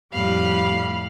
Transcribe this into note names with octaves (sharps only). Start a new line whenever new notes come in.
F2 A2 G3 F5 B5